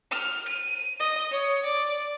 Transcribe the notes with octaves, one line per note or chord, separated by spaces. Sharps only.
F6
D#7
D#5
C#5
D5